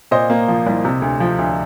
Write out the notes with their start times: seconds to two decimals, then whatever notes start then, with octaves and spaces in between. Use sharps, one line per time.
0.11 A#2 C5 D#5
0.30 A#3
0.48 F3
0.67 C2
0.85 C3
1.02 D2
1.20 F3
1.39 D2